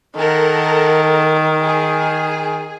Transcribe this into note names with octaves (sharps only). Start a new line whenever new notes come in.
D#3 A4 A#4 F#5
G#4